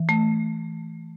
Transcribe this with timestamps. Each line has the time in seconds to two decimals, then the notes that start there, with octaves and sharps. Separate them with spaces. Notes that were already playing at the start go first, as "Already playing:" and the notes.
Already playing: E3
0.09 A3